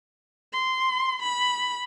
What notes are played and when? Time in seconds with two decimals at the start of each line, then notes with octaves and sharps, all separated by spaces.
0.53 C6
1.22 B5